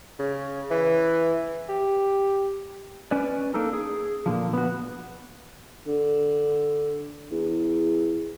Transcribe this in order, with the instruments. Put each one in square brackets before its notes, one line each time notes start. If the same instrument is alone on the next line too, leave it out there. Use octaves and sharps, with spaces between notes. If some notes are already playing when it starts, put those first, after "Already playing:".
[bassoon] C#3
E3
G4
[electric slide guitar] C#4 B4 D5
A#3 D4 D#4 A4 A#4
G#4
A#2 D3 F3
B3 F#4
[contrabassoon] D3
E2